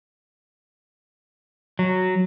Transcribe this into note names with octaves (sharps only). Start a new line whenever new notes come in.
F#3